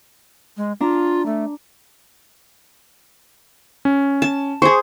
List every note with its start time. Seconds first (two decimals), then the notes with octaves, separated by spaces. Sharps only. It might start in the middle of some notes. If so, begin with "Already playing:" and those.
0.57 G#3
0.81 D4 F4 A#5
1.26 A3
3.85 C#4
4.22 A5
4.62 G#4 C5 C#6